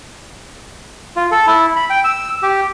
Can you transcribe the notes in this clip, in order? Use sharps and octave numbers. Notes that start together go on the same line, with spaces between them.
F4
A4
E4
B5
G5
E6
G4